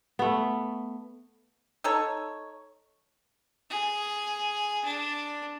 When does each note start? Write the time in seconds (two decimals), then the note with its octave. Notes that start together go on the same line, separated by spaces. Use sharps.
0.19 A3 B3
1.84 D#4 A4 C#5
3.70 G#4
4.85 D4